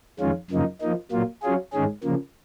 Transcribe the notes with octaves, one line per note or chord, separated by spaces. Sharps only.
F2 D#3 G#3 C#4 F4
F#2 C#3 F3 A#3 D#4
F3 A#3 D#4
A#2 F#3 A#3 F4
F#3 C#4 F4 G#4
G#2 D#3 G#3 C#4 G#4
C#3 F3 A#3